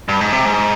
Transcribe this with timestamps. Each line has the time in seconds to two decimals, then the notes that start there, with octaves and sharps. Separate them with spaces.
0.09 G2
0.21 G#2
0.33 C3
0.45 G#2